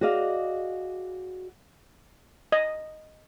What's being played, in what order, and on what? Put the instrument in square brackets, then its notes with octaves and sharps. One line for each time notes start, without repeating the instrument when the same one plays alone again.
[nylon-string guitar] F#4 G#4 D5 D#5 F5
[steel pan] D#5